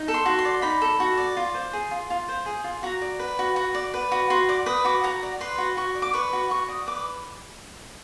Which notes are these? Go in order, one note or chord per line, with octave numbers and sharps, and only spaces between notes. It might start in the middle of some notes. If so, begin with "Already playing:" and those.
Already playing: D#4
A4
C6
F#4
C6
D5
D#4 B5
A4
F#4
D5
F4
C5
G#4
F4
F4
C5
G#4
F4
F#4 A#5
D5
B4
F#4
F#4
D5
B4
F#4
F#4 C6
D5 D6
B4 D#6
F#4 D6
F#4 A#5
D5
B4 C6
F#4
F#4 C#6
D5
D6
B4 C#6
F#4
F#4 C#6
D5 D#6
B4 D6